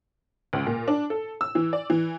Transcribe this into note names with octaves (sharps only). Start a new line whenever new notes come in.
C#2
A#2
D4
A4
E6
E3
D5
E3